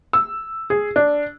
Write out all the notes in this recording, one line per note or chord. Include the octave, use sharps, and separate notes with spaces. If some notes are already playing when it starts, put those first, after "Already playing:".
E6
G#4
D4